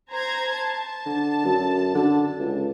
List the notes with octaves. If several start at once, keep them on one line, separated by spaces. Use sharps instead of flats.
C5 A#5 G#6
A5
D3
F#2
D3
C#2